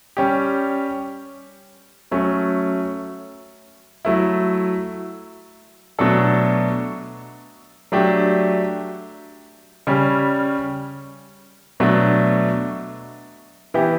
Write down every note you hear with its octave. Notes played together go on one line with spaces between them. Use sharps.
G3 C#4 G4
F#3 A3 C#4
F#3 A3 E4
B2 F#3 A3 D4 A4
F#3 A3 D4 G4
C#3 G3 C#4
B2 F#3 A3 D4
E3 B3 E4 G4